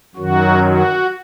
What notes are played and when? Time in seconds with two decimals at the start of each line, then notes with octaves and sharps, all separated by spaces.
0.15 F#2 D#3 F#3 F#4
0.64 F#4